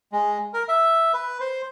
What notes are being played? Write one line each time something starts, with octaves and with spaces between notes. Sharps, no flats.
G#3
A#4
E5
B4
C5